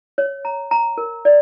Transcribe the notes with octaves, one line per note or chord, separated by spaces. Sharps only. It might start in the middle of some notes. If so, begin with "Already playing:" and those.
C#5
A#5
A#5
A#4
D5